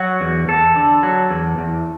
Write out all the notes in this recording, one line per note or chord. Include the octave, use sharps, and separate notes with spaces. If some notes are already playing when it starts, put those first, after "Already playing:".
Already playing: F#3 F#4
E2
E2 A4
D3
F#3
E2
E2